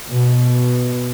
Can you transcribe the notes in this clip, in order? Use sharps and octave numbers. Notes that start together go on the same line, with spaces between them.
B2